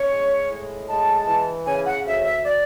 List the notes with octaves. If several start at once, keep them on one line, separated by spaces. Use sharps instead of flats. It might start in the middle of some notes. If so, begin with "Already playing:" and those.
Already playing: C#4 C#5
G#3
A2
G#3 A5
E3
C#3 G#5
F#5
D2 E5
E5
D5